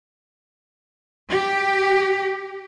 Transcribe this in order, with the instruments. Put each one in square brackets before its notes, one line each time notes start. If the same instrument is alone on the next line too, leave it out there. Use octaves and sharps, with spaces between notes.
[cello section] G4